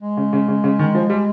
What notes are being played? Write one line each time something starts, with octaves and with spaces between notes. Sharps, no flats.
G#3
C#3
C#3
C#3
C#3
D#3
F3
G3